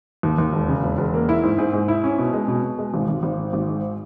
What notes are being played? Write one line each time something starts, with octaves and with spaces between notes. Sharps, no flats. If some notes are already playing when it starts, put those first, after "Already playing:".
D#2
D#2
E1
C#3
E1
E1
A#3
E4
G#2
G#2
G#2
E4
C#4
B2
G#3
B2
B2
G#3
G#1
G#1
G#1
G#2
G#1
G#2